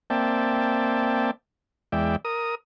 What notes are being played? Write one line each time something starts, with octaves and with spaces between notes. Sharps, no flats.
A#3 C4 D5 E5 G5 A5
E2 G#3 D5 E5 G5
A#4 D#6